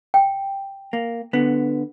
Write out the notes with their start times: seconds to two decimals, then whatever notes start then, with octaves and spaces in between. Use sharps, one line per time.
0.14 G5
0.93 A#3
1.33 D3 B3